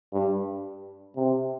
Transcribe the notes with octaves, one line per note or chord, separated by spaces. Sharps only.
G2
C3